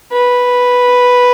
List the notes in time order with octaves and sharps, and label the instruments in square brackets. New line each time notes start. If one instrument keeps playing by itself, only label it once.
[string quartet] B4